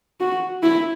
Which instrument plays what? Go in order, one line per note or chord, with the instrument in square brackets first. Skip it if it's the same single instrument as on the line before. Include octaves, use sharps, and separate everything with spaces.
[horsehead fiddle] F#4
E4